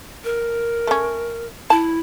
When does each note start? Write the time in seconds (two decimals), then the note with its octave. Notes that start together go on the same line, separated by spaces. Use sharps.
0.24 A#4
0.87 A3 C#4
1.70 E4 A5